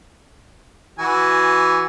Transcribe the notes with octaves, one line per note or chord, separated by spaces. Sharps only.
E3 F#4 G#5